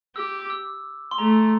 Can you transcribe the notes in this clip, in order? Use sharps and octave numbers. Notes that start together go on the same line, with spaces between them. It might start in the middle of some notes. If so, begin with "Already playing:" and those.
G4 E6
D6
E6
C6
A3 A#5